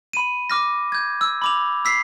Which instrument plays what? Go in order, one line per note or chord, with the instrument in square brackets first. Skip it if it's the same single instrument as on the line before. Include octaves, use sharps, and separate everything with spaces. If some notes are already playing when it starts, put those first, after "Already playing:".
[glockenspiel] B5 D#7
D6 F6 A#6
G6 G#6
E6
B5 D6 F7
E6 B6 C7